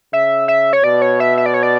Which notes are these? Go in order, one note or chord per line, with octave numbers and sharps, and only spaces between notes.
C#3 E5
E5
C#5
B2 D5
C#5
E5
E5
D5
C#5
D5